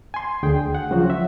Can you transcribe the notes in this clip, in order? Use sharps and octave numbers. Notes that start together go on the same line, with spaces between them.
G#5 C6
D2 D3 G#4 G5
F#5
C#3 F3 F#3 F#4 C5
E5